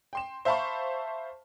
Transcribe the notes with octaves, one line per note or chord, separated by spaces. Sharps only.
G5 C6 E7
C5 E5 F5 A5 B5 C#6